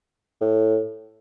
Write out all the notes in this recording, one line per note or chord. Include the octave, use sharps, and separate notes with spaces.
A2